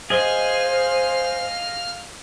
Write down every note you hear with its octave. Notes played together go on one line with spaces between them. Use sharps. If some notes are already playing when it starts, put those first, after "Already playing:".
G#4 C5 D#5 F5 F6